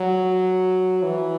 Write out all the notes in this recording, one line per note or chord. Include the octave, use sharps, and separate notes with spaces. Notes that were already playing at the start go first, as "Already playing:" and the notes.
Already playing: F#3
E3